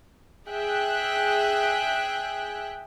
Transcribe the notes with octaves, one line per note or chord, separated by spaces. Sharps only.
G#4 E5 G5 F#6